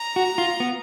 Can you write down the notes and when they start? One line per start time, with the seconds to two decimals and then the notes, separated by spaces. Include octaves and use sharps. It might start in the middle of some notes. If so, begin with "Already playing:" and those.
Already playing: A#5
0.16 F#4
0.38 F4
0.60 B3